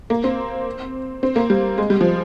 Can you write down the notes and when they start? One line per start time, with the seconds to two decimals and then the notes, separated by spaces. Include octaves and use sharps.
0.10 A#3
0.24 C4
1.23 C4
1.36 A#3
1.50 G3
1.78 G#3
1.90 G3
2.01 F3